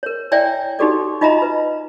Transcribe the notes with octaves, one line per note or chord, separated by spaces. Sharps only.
A#4 C#5
E4 C#5 D5 E5 G5 G#5
D#4 F#4 G4 A4 D5
D#4 F4 D#5 E5 A#5 B5
B4